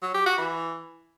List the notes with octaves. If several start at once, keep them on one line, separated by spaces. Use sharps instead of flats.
F#3
G4
F#4
E3